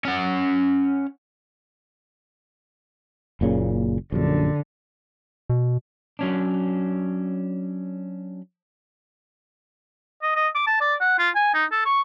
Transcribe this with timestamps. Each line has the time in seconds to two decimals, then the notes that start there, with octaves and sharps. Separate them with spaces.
0.05 C#4 F#5
3.41 F#1 A#2 C#3
4.12 A#1 F#2 D3
5.50 B2
6.19 F#3 C#4 D4
10.22 D#5
10.35 D#5
10.55 D6
10.67 A5
10.81 D5
11.01 F#5
11.19 F4
11.35 G#5
11.54 D#4
11.72 A4
11.86 C#6